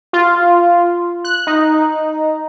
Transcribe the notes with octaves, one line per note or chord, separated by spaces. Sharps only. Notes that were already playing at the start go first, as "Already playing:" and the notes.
F4
F#6
D#4